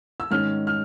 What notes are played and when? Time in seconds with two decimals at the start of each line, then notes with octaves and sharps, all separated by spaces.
0.20 E6
0.31 G#2 D#3 G#3 C#4 F6
0.67 F6